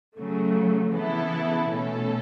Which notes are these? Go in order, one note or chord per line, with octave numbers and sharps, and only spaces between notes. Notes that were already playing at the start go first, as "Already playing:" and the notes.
C#3 F#3 A3
C#3 E3 B3 E4 A4
B2 A3 C#4 A4